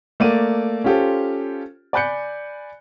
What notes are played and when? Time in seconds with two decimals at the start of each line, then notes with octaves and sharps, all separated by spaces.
0.20 A3 A#3 D5 D#7
0.84 C#4 F4 G4 A4 C5
1.93 D5 G#5 B5 F#6 G6 C#7